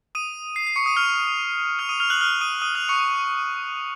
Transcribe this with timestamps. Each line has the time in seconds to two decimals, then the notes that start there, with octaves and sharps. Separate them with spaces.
0.15 D#6 D#7
0.56 C7
0.67 C7
0.76 C#6 C#7
0.86 D#6 D#7
0.97 F6 F7
1.79 F6 F7
1.89 D#6 D#7
2.00 F6 F7
2.10 F#6 F#7
2.21 F6 F7
2.41 D#6 D#7
2.62 D#6 D#7
2.75 F6 F7
2.89 C#6 C#7